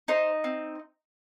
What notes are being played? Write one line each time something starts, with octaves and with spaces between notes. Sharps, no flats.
D#4 C5
C4